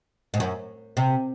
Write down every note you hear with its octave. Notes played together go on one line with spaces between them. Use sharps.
G#2
F#2
C3